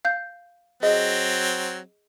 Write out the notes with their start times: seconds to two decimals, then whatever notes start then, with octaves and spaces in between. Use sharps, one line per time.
0.05 F5 G6
0.83 F#3 C4 G#4 D#5